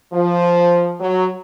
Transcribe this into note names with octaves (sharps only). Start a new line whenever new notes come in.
F3
F#3